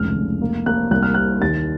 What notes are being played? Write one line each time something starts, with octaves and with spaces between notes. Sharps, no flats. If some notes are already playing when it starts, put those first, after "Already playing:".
Already playing: F1 C#2 F6
F1
A#3
A#3 F#6
C2 F#6
F6
C3 F#6
D#2 A6